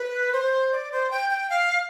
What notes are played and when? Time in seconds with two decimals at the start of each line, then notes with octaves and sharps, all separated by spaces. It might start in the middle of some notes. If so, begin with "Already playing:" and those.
Already playing: B4
0.33 C5
0.72 D5
0.92 C5
1.11 G5
1.30 G5
1.50 F5